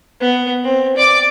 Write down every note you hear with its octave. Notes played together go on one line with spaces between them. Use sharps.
B3
C4
D5 D6